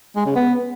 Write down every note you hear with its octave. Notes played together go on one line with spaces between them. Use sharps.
G#3
C#3
B3